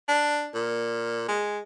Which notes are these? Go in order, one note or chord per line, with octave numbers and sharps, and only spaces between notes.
D4
A#2
G#3